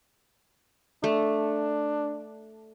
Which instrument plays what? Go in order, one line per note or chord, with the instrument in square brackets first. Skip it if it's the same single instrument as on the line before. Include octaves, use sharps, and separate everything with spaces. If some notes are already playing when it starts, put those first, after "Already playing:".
[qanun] A3 [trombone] D4